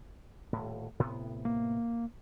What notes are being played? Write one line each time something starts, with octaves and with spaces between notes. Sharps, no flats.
D#1 A2
A2 C3 B3
A#3